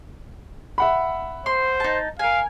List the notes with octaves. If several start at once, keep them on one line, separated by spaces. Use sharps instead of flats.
E5 F#5 B5
C5 C6
D#4 A5
A#4 F5 G#5